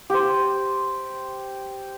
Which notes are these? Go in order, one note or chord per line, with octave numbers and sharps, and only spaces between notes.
G4 C5